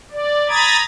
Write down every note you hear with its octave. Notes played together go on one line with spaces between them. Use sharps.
D5
A#5 B5 D#6 G#6 A6